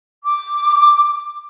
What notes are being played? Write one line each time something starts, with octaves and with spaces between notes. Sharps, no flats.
D6